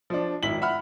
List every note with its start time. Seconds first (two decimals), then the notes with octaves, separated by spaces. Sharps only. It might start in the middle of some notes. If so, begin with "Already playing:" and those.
0.10 F3 D4
0.43 G#1 E4 B6 F#7
0.62 E5 F#5 B5 F6